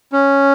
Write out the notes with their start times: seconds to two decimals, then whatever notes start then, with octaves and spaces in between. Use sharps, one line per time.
0.12 C#4